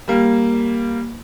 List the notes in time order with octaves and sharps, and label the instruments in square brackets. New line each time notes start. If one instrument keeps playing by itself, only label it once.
[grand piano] G3 A#3